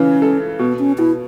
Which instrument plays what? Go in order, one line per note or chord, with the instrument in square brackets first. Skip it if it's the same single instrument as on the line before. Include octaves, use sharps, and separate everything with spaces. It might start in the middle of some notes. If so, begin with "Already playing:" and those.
Already playing: [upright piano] C#3 E3 [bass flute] C#4
[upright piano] A4
[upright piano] B2 [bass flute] B3
[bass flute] C#4
[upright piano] B2 [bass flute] E4